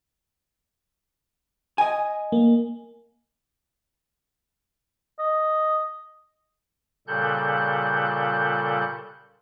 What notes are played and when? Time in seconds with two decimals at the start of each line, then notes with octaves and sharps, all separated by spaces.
1.78 D#5 G#5
2.32 A#3
5.19 D#5
7.07 A#2 C#3 G3 A4 F#6 G6